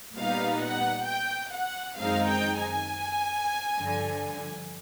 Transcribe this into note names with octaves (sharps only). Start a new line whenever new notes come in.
A#2 G3 B3 D#4 F5
F#5
G5
F#5
F#2 D#3 G#3 C4 D#4 F5
G5
G#5
G2 D3 F3